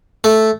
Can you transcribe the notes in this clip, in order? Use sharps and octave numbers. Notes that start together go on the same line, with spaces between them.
A3